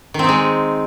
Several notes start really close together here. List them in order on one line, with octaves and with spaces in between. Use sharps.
D#3 C4 D#4 G#3